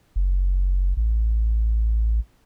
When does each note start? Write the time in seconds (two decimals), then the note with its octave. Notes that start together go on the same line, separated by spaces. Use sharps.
0.16 F#1
0.97 A1